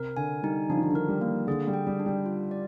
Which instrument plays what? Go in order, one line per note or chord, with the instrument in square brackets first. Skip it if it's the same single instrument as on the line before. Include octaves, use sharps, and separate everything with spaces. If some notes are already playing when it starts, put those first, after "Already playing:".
Already playing: [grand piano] C3 [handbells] A#4
[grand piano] D3 [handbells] G#5
[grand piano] G3 [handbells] D#4
[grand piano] F3 [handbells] D4
[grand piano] D#3
D3
[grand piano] D#3 [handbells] A#4
[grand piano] G3
[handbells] A#3
[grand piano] D3 [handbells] G#4
[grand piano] G3
[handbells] G5
[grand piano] G3
[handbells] D4
[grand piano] G3
[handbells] F4
D5